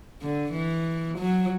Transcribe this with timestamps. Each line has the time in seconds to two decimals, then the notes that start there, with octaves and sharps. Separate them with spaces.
0.22 D3
0.53 E3
1.18 F#3